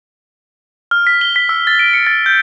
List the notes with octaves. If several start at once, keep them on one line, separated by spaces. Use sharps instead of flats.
F6
B6
G7
B6
E6
A6
D7
C#7
A6
G6